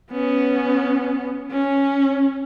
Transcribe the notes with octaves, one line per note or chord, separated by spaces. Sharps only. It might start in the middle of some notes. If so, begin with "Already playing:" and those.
B3 C#4
C#4